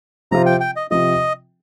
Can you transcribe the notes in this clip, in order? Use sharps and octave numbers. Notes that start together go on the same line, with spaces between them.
C3 F3 C4 F4 A#5
G5
G5
D#5
C3 F3 C4 F4 D#5